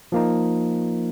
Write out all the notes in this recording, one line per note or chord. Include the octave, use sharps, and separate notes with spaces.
F3 A#3 D#4